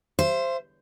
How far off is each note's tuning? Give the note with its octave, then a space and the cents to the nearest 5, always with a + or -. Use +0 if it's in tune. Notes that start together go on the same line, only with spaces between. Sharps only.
C5 +0 E5 +45